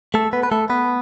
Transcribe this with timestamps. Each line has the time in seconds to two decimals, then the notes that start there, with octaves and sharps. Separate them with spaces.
0.14 A3 A4
0.33 B3 B4
0.43 B4
0.52 A3 A4
0.70 B3 B4